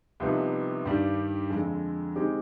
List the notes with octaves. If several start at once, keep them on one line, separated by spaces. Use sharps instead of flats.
C2 C3 F3 B3 D#4
G2 D#3 G3 D4
F2 D3 G#3
D#3 G#3 C4 D#4 G4